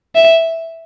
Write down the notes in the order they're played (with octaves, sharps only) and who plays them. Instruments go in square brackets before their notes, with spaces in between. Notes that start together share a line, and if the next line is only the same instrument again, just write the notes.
[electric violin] E5